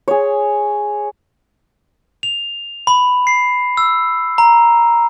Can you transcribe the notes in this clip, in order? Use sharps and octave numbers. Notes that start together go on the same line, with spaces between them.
G#4 C#5
F7
B5
C7
E6
A#5